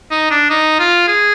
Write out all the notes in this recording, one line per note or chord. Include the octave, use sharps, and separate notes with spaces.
D#4
D4
D#4
F4
G#4